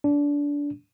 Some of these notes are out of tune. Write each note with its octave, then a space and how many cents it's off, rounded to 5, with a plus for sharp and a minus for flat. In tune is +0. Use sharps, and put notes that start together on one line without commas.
D4 -25